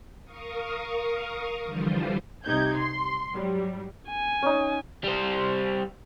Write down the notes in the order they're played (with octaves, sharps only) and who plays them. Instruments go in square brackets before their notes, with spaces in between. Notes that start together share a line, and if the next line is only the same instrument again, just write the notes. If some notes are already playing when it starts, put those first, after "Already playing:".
[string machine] A#4 F5 C#6 D#6
D3 E3 F3 G3 F4 C5
[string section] C2 C3 D#4 G4 G6 G#6
C6
G#2 F#3 G3
[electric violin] G#5
[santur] C#4 D#4
[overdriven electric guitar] G3 C5